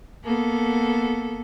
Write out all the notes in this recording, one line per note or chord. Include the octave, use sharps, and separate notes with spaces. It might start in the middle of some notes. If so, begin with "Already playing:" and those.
A#3 B3 A4